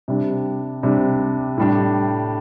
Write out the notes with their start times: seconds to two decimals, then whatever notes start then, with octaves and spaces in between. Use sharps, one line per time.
0.08 C3 G3 D4
0.83 C3 G3 D4
1.57 A2 G3 D4